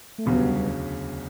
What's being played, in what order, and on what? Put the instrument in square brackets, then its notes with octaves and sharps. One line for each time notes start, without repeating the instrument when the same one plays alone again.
[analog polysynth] A3
[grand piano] E1 D2 C#3 F#3 [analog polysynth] G3 B3